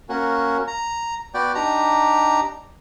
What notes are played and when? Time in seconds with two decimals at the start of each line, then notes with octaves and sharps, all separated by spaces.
0.09 A#3 C#4 F#4
0.67 A#5
1.34 B3 F#4 D5 G5
1.55 D4 D#4 G4 A#5